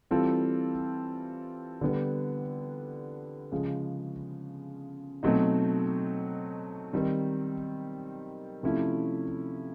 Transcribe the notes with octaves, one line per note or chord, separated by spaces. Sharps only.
E3 G3 C4 F4 A4
D3 G3 B3
C#3 F3 G#3 C#4
B2 F#3 A3 C4 D#4
D#3 G3 C4
C3 F3 A3 C#4 E4